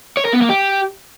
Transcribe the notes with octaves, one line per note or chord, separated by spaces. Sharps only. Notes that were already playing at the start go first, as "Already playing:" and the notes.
C#5
A#4
B3
A#3
G4